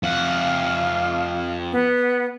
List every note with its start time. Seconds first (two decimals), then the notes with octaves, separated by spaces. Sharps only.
0.03 F2 F5 F#5
1.72 B3